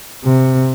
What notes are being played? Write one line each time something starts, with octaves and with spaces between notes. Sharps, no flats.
C3